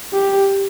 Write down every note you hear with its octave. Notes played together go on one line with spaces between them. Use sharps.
G4